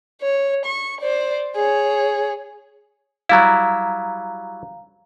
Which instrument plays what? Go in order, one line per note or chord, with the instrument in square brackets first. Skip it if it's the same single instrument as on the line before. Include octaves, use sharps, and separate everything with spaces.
[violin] C#5
C#6
C5 D5
G#4 C#5
[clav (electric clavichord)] F#3 G3 E4 [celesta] F5 A#5